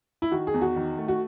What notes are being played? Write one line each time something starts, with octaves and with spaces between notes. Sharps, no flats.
E4
D#3 F#4
G#4
E2
F#4
D#3
A3
F#4